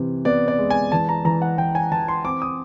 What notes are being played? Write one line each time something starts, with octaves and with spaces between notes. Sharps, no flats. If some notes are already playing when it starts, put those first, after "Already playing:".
Already playing: C3 E3
B3 D5
D5
G#3
G#5
E3 A5
A#5
E3 A#5
F#5
E3 G5
G#5
E3 A5
C6
C4 D6
D#6